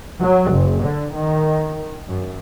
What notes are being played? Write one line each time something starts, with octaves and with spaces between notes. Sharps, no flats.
F#3
F#1
D3
D#3
F#2